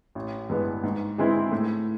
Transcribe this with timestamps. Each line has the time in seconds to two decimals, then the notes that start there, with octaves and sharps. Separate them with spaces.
0.15 A1
0.49 G2 E3 G#3 B3
0.83 G#2
1.18 E3 G#3 C4 E4
1.52 A2